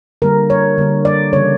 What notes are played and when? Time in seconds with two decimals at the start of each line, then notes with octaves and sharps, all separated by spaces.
0.22 D3 G3 A#3 A#4
0.50 C#5
0.78 D3 G3 A#3
1.05 D5
1.33 C#3 E3 G3 A#3 C#5